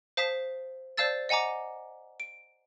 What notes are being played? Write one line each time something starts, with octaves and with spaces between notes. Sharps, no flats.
C5 F5 A5 D#6 B6
C5 D5 F5 A5 E6 A6
D#5 F#5 G#5 A#5 D6
D7